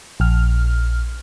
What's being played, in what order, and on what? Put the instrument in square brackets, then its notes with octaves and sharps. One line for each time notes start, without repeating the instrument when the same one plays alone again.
[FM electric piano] A#1 F6